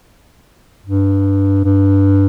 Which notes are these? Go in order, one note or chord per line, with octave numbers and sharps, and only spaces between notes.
G2
G2